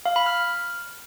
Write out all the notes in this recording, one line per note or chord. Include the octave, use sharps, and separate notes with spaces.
F5
B5
F6